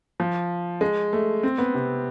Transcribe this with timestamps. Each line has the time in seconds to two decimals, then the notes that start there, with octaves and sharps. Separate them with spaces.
0.20 F3
0.81 G#3
1.13 A3
1.43 C4
1.58 B3
1.74 C3